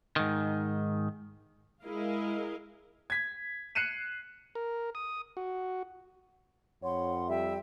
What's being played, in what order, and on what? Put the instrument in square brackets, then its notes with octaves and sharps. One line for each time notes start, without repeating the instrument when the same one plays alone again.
[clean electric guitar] G#2 D#3
[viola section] G#3 E4 A#4 D#5 F5
[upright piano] G#6 B6
F#6 C7 C#7 D#7 E7
[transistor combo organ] A#4
D#6
F#4
[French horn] F2 [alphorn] C#5 [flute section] F#5 B5 C6
[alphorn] G3 [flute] E5 [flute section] G5